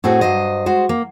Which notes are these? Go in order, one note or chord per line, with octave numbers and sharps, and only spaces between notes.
A2 A3 C4 F#4 G#4
G2 F#3 C5 D#5
G#3 F#4 C5
A#3